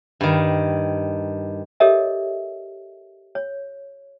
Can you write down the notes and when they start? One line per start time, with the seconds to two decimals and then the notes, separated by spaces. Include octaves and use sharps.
0.21 G2 D#3
1.80 G4 A4 A#4 C#5 D#5 E5
3.35 C#5